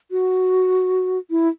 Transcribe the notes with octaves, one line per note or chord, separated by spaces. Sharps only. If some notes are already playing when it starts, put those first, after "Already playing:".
F#4
E4